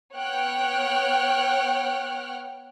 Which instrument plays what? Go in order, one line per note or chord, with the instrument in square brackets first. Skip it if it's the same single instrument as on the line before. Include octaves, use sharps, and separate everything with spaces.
[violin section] B3 C#5 F#5 G5 F6 F#6